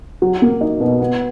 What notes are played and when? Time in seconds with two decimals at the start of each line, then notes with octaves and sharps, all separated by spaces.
0.22 F#3
0.42 A#3
0.61 D#4
0.80 B2
1.00 B3